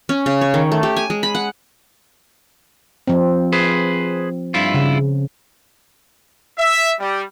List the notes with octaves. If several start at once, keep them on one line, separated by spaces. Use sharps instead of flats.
C#4
C#3
C#5
D#3
A3
G4
G#5
G#3
B5
F#5
F3 C4
G#4 B4 C5
G2 E4 F4
C#3
E5
G3